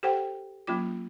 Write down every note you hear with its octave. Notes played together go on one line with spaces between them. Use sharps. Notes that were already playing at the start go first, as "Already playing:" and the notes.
G4 A4 C5 F#5 G5
F#3 A#3 C#4 F4 D6